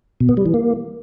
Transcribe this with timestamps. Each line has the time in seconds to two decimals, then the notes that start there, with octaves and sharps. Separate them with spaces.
0.20 B2
0.29 B3
0.37 G3
0.46 E3
0.54 A#3